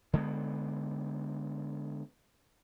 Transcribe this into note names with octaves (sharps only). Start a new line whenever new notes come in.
D3 G#3 A#3 B3